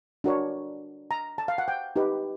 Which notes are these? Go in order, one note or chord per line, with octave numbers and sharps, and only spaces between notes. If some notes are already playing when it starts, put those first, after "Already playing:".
D4 F#4 A#4 C#5
A#5
A5
F5
F#5
G5
D#4 G4 B4